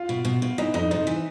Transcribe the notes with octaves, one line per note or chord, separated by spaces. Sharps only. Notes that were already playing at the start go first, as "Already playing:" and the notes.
Already playing: F4
B2
B2
B2
E3 D#4
F2 D#4
C3 D#4
E3